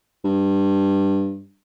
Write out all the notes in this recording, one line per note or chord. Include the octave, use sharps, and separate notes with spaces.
G2